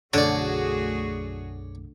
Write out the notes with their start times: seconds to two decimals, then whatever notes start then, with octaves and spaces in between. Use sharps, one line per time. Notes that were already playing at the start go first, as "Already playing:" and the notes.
0.13 B1 F#2 D3 A3 F#4 G#4 C#5 D5